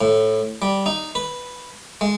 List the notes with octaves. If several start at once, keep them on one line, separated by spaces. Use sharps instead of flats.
A2
G3
D#4
B4
G#3